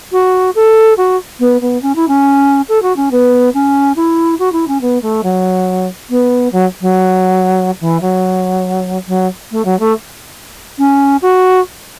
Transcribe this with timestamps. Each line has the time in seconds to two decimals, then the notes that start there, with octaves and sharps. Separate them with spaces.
0.12 F#4
0.55 A4
0.97 F#4
1.39 B3
1.61 B3
1.82 C#4
1.95 E4
2.08 C#4
2.68 A4
2.82 F#4
2.96 C#4
3.11 B3
3.54 C#4
3.96 E4
4.39 F#4
4.52 E4
4.68 C#4
4.81 B3
5.02 A3
5.23 F#3
6.09 B3
6.52 F#3
6.81 F#3
7.80 E3
8.01 F#3
9.07 F#3
9.51 A3
9.65 F#3
9.79 A3
10.78 C#4
11.22 F#4